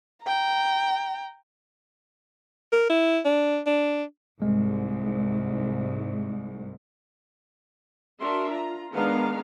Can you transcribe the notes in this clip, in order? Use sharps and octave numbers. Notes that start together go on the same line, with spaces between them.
G5 A#5
A#4
E4
D4
D4
C2 G#2 G#3
D4 F#4 A#4 E5 C6
F4 A#5
D#3 G#3 B3 D4 F5 A#5